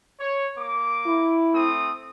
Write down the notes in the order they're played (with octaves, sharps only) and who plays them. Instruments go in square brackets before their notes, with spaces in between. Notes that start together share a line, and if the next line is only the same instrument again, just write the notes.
[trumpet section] C#5
A#3 D6
[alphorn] E4
[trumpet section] A3 C4 D#6